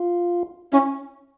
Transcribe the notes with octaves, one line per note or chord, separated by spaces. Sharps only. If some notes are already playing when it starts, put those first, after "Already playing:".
Already playing: F4
C#4 E4